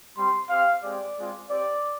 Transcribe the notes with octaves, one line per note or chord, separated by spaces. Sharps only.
G3 C4 G4 C6
C4 G4 F5
G#3 C4 G4 D5
G#3 C4 F4
C4 G4 D5